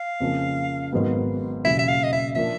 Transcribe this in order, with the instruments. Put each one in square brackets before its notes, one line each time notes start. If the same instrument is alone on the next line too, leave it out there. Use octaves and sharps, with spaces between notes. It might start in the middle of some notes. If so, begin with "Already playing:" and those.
Already playing: [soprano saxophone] F5
[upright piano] F2 C#3 F3 A#3
G#1 G#2 D#3 F#3 B3
[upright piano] E1 D#2 C#3 F#3 [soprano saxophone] E5
[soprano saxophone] E5
F5
D#5
E5
[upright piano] A#2 F3 A#3 D4 [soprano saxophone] E5